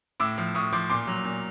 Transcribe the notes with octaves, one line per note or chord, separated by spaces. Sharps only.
A2 D6 E6
F3
A2 C#6 D#6
F3 C6 D6
A#2 C6 D6
F#3
A#2